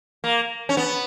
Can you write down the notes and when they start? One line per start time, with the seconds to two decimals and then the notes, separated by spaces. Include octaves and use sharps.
0.24 A#3
0.69 C#4
0.77 B3